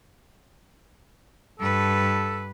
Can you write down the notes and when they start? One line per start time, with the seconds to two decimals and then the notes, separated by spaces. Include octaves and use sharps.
1.60 G2 A4 B4